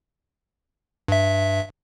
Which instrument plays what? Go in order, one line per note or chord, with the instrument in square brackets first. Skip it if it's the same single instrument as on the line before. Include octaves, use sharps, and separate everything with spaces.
[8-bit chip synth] G2 E5